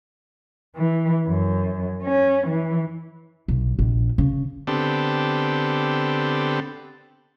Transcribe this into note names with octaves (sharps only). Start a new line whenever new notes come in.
E3
F#2
C#4
E3
B1
A#1
C#3
D3 B3 C4 G4 A4